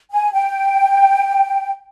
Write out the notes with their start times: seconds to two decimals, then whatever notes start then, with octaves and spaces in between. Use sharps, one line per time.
0.12 G#5
0.33 G5